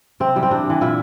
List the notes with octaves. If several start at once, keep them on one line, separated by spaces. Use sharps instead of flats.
C3 C4
E3 G3
C4
C3 D4
E3 G3
A#2 E4